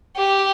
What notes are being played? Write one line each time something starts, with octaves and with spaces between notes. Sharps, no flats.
G4